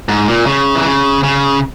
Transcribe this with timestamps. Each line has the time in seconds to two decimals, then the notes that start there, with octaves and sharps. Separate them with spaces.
0.09 G#2
0.28 A#2
0.46 C#3
0.75 E3
0.85 C#3
1.23 C#3